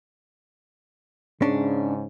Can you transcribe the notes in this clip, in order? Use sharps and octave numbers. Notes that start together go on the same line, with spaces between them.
G#2 C#3 C#4 D4